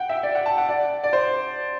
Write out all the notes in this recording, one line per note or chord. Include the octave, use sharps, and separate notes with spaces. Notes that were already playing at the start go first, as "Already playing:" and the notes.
Already playing: F#5 G5
E5
D5
F#5
A5
F#5
D5
D5
C5